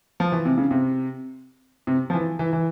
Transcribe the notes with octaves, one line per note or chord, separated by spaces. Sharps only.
F3
E3
C3
C#3
C3
C3
F3
E3
E3
E3